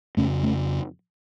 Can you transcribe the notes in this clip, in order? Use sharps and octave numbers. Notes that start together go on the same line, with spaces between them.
F2 C#3 A3 C#4
A3 C#4